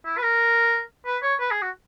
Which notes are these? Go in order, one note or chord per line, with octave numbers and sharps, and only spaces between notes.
E4
B4
A#4
B4
C#5
B4
G#4
F#4